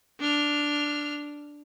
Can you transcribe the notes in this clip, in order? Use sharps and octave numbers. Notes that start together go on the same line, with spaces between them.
D4 F6